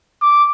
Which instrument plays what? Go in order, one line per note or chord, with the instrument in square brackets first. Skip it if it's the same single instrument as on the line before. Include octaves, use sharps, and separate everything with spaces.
[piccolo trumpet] D6